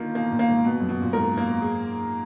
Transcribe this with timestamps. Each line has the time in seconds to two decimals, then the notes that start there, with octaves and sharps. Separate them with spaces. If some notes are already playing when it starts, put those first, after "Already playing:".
Already playing: D3 D#3 A#3 F4
0.15 B2 A#3
0.31 A#2
0.39 A#3
0.48 G#2
0.65 B2
0.80 F#2
0.89 B2
1.02 A#2
1.13 G#2 A#4
1.37 A#3
1.62 G#4